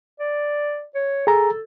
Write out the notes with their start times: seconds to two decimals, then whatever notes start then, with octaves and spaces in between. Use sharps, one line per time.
0.20 D5
0.95 C#5
1.27 G#4 A4 A#5